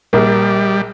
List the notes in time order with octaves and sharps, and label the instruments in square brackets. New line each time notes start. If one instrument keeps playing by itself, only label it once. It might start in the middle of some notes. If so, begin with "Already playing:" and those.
[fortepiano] A#1 A#3 [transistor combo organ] G3